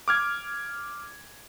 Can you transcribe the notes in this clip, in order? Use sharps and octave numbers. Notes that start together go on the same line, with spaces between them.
D6 F6 G#6